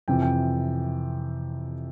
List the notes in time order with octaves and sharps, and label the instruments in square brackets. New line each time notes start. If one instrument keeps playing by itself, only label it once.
[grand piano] F2 C3 E3 G5
G5